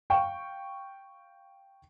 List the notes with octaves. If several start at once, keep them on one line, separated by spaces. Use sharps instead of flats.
F5 G5 C#6